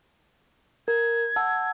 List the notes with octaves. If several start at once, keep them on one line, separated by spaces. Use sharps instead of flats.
A#4 G#6
F#5 A5 E6